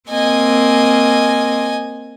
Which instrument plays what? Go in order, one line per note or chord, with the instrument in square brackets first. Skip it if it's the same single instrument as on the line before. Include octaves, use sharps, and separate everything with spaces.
[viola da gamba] A#3 C4 [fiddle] D#5 G#5